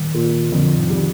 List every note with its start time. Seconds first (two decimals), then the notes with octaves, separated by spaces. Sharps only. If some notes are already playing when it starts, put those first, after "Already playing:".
Already playing: D#3 G3
0.14 A#2
0.52 F2 D3 F3
0.77 C3 D#3
0.90 G3